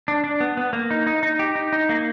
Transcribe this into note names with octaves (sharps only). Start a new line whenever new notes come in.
D4
D4
B3
B3
A#3
D#4
D#4
D#4
G4
D#4
D#4
A#3